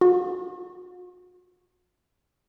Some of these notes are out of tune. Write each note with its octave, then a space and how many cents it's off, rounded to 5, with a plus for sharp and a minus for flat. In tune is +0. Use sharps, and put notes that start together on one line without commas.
F#4 -45